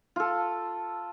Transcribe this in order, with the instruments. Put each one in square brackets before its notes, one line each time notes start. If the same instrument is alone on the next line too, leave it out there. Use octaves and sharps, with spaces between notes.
[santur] F4 A4